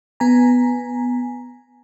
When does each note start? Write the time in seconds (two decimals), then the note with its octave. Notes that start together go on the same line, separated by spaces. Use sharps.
0.20 B3 G#5 A#5